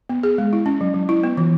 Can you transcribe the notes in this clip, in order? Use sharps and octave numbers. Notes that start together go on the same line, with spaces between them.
B3
G#4
G#3
E4
C#4
F#3
F#3
E4
B3
E3